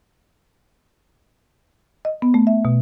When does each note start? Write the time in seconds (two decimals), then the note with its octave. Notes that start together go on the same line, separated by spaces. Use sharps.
2.05 D#5
2.22 B3
2.34 A3
2.47 E5
2.65 B2